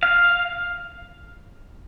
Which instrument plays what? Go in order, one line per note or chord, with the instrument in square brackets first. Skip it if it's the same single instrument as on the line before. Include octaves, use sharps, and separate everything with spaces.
[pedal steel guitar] F5